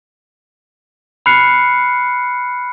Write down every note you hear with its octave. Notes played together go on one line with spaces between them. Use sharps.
B5 F6 F#6 C7 C#7